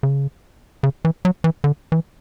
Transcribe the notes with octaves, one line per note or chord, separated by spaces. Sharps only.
C#3
C#3
E3
F#3
E3
D3
E3